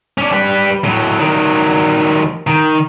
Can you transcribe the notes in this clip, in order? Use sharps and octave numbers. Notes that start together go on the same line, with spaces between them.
C#4 D4
G3 B4
A2 F#3
D#3 F#3
D#3